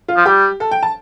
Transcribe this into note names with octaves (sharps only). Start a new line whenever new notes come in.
F4
F3
G3 G4
A4
G5
A5